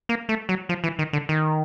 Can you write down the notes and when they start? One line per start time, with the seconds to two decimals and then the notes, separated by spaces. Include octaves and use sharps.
0.09 A#3
0.29 A3
0.49 F#3
0.69 F3
0.84 E3
0.99 D#3
1.13 D3
1.29 D#3